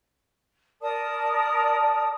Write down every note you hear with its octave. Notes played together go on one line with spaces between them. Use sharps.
A#4 D5 A5 D#6